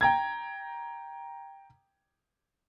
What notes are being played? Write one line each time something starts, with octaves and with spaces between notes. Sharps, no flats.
G5 A#5 G#6